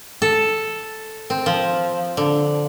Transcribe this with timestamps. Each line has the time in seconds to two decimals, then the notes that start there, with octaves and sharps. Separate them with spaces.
0.22 A4
1.30 C4
1.46 F3
2.17 D3